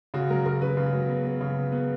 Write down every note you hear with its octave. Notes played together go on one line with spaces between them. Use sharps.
C#3 F#4
F#3 A#4
C#3 A#4
C#3 B4
C#3
F#3
B3
B3
C#3
B3
B3